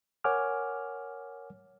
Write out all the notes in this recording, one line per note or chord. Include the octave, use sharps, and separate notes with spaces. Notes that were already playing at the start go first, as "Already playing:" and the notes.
A#4 C#5 F#5 G#5 D6 F6